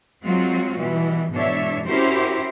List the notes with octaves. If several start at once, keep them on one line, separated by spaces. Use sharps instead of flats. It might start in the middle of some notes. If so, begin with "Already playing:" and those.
F#3 G#3 C4 F4 F#4
B2 E3 G3
G#2 B2 E3 D4 C#5 E5
C#4 E4 F#4 G4 A#4 C5